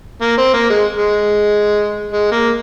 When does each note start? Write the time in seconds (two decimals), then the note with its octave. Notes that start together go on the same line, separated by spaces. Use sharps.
0.21 A#3
0.37 C4
0.53 A#3
0.70 G#3
0.97 G#3
2.11 G#3
2.31 A#3